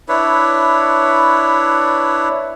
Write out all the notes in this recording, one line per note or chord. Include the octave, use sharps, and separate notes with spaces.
D4 E4 B4 C#5